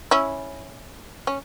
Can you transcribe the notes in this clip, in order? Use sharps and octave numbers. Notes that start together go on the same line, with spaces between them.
C#4 E4
C#4